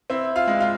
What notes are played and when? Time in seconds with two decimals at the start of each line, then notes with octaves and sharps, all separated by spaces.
0.10 C4 E4 E5
0.36 F4 F5
0.48 G#3
0.60 F4 F5